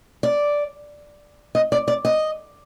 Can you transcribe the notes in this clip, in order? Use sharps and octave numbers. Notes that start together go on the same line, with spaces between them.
D5
D#5
D5
D5
D#5